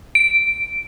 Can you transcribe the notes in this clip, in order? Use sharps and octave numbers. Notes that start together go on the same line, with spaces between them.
D7